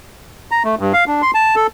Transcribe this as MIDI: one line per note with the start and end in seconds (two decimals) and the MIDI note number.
0.51 0.63 82
0.64 0.75 57
0.79 0.93 43
0.93 1.05 77
1.07 1.22 62
1.22 1.31 84
1.34 1.55 81
1.56 1.67 69